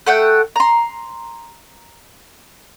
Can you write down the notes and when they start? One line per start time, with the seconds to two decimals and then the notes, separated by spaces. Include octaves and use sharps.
0.07 A3 F#5 G5
0.56 A#5 C6